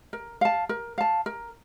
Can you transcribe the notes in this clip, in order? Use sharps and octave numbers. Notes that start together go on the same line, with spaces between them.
A#4
F5 A5
A#4
F5 A5
A#4